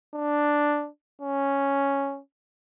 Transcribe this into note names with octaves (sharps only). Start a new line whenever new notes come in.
D4
C#4